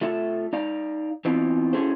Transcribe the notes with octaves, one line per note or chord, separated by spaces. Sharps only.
A3 F4 A4 E5
D#4 D5 F5
E3 B3 C4 D#4 F4
C#4 E4 F#4 G#4 A4 C5